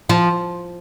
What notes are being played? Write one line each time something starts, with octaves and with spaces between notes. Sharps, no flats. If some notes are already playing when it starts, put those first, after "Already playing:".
F3